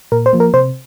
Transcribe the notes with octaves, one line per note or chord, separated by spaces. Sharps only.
A#2 A#4
C5
F3 A#3
A#4
C3 C5